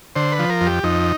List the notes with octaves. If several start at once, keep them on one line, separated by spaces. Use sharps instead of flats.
D3 C5
B4
F3
A#4
F2
G4
F2 D#4